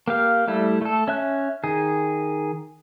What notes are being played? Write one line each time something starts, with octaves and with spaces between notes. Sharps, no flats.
A#3 G4 F5
G3 A3 E4
A3 A4
C#4 E5 F#6
D#3 G#4